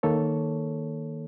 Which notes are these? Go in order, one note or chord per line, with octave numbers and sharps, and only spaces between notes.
D#3 A#3 A4 C#5